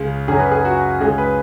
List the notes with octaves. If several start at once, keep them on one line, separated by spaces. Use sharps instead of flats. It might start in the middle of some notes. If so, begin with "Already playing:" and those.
Already playing: C#2 C#3 G#3
F#2 C#3 F#3 G#4
B4
G#4
F#4
C#2 C#3 G#3 G#4
B4